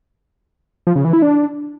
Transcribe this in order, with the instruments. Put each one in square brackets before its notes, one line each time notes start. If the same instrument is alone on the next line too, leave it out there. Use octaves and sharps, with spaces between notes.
[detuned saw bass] F3
C#3
E3
E4
D4